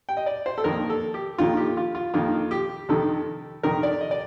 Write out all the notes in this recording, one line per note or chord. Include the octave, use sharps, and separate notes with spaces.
G5
D#5
D5
C5
A4
F2 D#3 A#3 A#4
A4
G4
F2 D#3 A#3 F4
G4
F4
F4
F2 D#3 A#3 F4
G4
F2 C3 D#3 A4
F2 C3 D#3 A#4
D5
D#5
D5